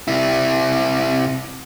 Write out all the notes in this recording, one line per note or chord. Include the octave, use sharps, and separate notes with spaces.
C3 E4